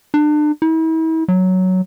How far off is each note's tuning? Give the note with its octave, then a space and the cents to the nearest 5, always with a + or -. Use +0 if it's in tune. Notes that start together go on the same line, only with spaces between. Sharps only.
D4 +35
E4 -40
F#3 +5